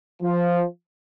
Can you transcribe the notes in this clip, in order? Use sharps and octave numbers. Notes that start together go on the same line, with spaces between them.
F3